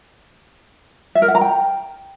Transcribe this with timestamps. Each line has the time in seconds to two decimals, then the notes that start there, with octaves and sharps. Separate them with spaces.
1.15 E5
1.22 A#4
1.28 F#5
1.35 A#5
1.41 G5